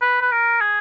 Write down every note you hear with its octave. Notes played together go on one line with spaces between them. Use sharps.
B4
B4
A#4
G#4